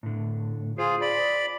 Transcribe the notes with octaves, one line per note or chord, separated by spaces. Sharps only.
A2 D3
F4 G#4 C5
D5 B5